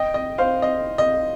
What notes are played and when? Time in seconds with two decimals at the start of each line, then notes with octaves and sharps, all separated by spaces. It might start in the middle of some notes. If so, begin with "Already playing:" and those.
Already playing: D#5 G5
0.14 D#5
0.38 C5 F5
0.62 D#5
0.98 D#5